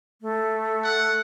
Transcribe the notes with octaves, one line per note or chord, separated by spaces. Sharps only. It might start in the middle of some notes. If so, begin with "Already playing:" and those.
A3
F#5